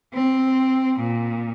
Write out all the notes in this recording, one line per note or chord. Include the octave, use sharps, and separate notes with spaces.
C4
A#2